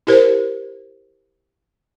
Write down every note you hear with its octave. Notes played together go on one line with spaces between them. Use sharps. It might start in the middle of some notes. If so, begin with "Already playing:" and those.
E4 G4 A#4 C5